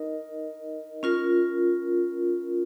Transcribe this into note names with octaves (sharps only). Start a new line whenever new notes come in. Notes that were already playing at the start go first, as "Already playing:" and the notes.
Already playing: D#4 A#4 D#5
C#4 F4 A#4